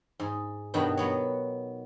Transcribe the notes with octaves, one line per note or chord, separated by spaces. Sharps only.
G#2
G2 B2 D#3 F#3 F#4
F#3 B3 C#5